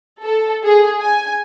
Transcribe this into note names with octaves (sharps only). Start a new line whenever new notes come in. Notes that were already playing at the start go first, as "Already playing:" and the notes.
A4
G#4
G#5